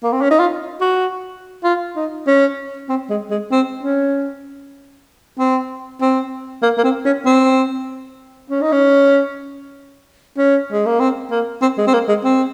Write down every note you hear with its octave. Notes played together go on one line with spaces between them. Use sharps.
A#3
C4
C#4
D#4
F4
F#4
F4
D#4
C#4
C4
G#3
G#3
C4
C#4
C4
C4
A#3
A#3
C4
C#4
C4
C#4
D#4
C#4
C#4
G#3
A#3
C4
A#3
C4
G#3
C4
A#3
G#3
C4